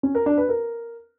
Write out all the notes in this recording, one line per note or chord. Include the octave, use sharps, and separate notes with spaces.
C#4
A#4
D4
B4
A#4